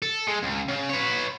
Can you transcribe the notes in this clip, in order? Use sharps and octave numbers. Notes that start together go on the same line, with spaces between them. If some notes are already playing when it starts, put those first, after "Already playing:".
A4
G#3
C#2
C#3
B4 C#5